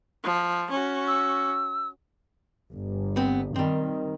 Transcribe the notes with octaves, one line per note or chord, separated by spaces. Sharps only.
F3
C#4 F#4
E6
G1
B3 C4
D#3 G3 C4